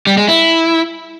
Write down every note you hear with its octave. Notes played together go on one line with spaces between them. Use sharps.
G3
G#3
E4